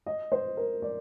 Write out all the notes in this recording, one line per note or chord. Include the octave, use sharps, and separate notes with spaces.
D#5
C5
A#4
D5